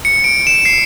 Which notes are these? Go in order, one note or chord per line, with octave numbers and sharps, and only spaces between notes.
C#7
D7
E7
C7